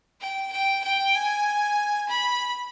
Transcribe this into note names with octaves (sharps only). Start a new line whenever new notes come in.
G5
G5
G5
G#5
B5